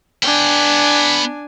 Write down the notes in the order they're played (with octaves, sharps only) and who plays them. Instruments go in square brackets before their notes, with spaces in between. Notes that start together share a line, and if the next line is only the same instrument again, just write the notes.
[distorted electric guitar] B3 G5 [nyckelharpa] D4 G#5